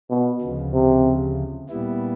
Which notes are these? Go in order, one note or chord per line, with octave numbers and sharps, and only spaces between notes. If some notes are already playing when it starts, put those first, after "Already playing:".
B2
D2 C#3 F3
C3
A#2 G3 B3 E4